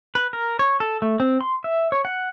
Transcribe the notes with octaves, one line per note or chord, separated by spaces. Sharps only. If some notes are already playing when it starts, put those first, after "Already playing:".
B4
A#4
C#5
A4
A3
C4
C6
E5
C#5
F#5